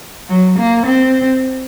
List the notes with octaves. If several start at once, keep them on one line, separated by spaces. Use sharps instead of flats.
F#3
A#3
C4